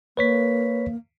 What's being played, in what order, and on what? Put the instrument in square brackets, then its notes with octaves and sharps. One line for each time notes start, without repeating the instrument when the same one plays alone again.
[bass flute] A#3 [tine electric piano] B4 C#5 B6